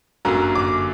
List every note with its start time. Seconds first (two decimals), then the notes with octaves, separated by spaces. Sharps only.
0.25 G1 F#2 D3 F#3 A#3 A#5
0.55 D6